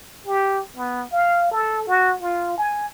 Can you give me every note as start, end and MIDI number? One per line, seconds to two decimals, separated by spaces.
0.27 0.61 67
0.77 1.04 59
1.12 1.47 77
1.51 1.85 69
1.88 2.15 66
2.22 2.55 65
2.58 2.87 80